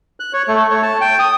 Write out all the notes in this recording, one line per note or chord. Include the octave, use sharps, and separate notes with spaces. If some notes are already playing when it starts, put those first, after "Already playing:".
F#6
C#5
A3
C#5
A5
G5
D#6